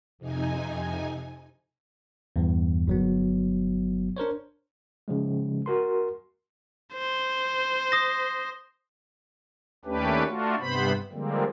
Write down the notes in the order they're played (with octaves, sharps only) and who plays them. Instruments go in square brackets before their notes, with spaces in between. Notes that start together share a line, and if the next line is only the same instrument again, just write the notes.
[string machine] F2 C3 D#4 G#5
[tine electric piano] E2 G2 E3
G1 F#3 B3
D4 A#4 C5 C#5
C#3 F3 G#3
F#4 A#4 C6
[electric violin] C5
[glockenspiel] D#6 A#6
[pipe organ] D#2 A3 C#4 D4 G4 B4
A3 D4 F4 F#4
G2 C3 B3 C5 B5
D3 F3 G3 G#3 A#3 C4